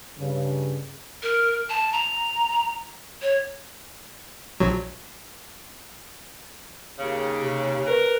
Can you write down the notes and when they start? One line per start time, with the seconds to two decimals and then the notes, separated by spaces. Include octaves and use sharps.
0.19 G2 C#3
1.23 A#4
1.70 A5
1.92 A#5
3.22 C#5
4.60 A#1 F#3
6.99 D#2 C#3
7.42 C3
7.87 A#4 B4